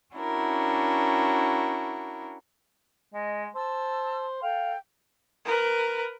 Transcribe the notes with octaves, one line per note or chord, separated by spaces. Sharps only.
C#4 D4 E4 F#4 A#4
G#3 D#5
C5 A5 E6
A4 F5 G5
A#4 B4